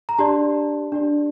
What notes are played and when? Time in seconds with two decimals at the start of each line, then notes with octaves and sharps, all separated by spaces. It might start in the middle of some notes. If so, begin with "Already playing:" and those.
0.09 A#5
0.18 D4 G4 D5 A5 C6
0.92 D4 G4 D5